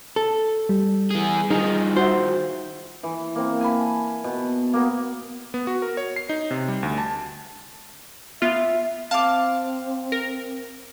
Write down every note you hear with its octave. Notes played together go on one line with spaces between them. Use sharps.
A4
G3
E3 G#4
D#3 F3 D#4 G#4
F#4 C5 E5
E3
A#3 C4
G#5 A5 B5
B2
A#3 B3
B3
F#4
A#4
C#5
C7
D#4
C3
G3
D2
A5
B3 F4 E5
C4 F5 A5 D6
A#4